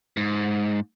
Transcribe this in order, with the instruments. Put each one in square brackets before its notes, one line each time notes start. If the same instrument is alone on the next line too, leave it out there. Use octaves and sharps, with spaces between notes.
[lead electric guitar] G#2